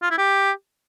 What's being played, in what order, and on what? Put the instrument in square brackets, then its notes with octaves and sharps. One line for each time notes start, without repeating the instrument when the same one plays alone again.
[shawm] F4
E4
G4